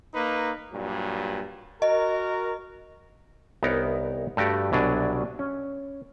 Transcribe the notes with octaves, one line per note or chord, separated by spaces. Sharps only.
A#3 D#4 B4
G2 A#2 F#3
F#4 A#4 D#5
C2 B3 D#4 A#4 C#5
G2 A3 F#4 G4 D5
C2 B2 F#3 D4 G#5
C#4